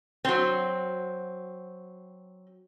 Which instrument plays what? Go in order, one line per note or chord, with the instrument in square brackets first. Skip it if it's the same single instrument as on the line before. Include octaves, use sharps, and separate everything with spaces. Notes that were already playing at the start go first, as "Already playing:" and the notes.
[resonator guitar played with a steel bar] F#3 C4